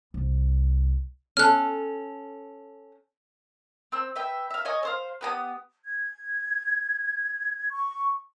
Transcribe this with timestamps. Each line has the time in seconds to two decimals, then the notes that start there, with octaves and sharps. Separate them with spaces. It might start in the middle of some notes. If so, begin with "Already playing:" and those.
0.14 C2
1.37 C#4 A4 F6 F#6
3.92 C4 E6
4.16 B4 E5 G5
4.51 E5 F5
4.65 C#5 D#5 G#5 C#6
4.83 A4 C5 F5
5.21 B3 G4 G#5 D#6
5.84 G#6
7.70 C#6